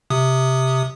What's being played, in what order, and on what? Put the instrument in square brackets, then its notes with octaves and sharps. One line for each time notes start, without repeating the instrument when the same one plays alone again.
[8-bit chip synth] C3 D#6